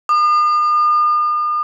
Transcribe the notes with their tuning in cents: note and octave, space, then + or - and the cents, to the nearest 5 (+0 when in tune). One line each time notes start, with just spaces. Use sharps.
D#6 -45